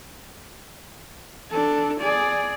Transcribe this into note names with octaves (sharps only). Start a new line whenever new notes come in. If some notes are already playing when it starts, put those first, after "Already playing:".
D4 A4
G#4 D5